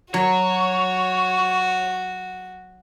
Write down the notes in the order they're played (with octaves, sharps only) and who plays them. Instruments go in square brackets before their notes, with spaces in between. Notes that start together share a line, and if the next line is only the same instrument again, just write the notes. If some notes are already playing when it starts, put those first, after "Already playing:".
[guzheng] F#3 [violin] F#4 [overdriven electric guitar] C#5